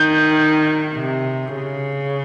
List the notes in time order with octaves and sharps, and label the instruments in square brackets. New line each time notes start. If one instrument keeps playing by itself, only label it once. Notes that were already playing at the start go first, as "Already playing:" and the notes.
Already playing: [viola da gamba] D#3 [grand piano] G6
[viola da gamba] C3
C#3